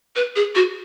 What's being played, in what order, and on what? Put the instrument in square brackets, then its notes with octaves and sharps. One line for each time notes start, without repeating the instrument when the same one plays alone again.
[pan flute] B4
G#4
F#4